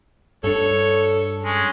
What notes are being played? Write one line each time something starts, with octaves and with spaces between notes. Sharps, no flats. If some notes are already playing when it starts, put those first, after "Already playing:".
G2 D4 A4 C#5
G#3 C#4